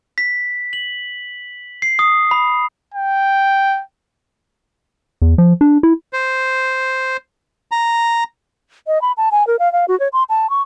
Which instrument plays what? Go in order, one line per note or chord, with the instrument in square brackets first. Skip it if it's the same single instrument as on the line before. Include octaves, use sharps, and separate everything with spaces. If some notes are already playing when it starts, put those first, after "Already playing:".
[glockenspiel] B6
F#7
C7
D#6
B5
[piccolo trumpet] G5
[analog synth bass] E2
F3
D4
E4
[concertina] C5
A#5
[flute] D#5
B5
A5
G#5
A#4
F5
F5
F#4
C#5
C6
A5
C#6